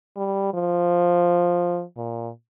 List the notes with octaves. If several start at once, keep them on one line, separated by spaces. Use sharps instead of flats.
G3
F3
A#2